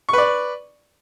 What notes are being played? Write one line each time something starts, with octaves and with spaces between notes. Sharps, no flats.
B4 D5 C#6